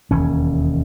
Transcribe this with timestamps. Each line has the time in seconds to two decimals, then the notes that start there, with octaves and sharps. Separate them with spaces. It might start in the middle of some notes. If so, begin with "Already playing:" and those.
0.11 E1 D#2 C#4